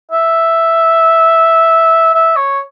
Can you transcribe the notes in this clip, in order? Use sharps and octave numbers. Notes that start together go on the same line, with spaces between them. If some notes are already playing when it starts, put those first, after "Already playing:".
E5
E5
C#5